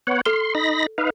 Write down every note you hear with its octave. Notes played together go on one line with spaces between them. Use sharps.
B3 C#5 F#5
A4 C6 F6 G7
D#4 B5 A#6
D#4 B4 F5